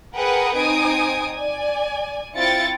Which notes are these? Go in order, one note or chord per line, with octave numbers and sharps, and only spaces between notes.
G#4 A#4 B4 F#5 G5 D#6
C4 D#4 G#5 D#6 D7
D5 G#5
C4 E4 F4 G5 A6 C#7